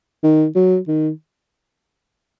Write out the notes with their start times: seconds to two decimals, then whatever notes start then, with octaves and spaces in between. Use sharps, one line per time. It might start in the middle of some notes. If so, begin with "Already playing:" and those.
0.24 D#3
0.55 F#3
0.88 D#3